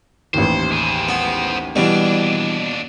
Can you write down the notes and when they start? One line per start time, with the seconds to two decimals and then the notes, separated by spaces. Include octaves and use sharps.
0.34 A1 D#2 C5
0.72 G#4 C5
1.09 B3
1.76 D#2 B2 E3 G3 D4